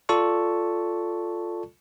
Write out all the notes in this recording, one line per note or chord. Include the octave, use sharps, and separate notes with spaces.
F4 A4 D5 A5 C#6